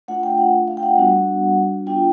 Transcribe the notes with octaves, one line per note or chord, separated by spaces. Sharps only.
A3 D4 F4 F#5
G5
F#5
F5
G5
F#5
G3 B3 D4 F#4
B3 D4 F4 G5